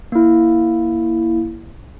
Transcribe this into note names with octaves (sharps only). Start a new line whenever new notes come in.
A#3 E4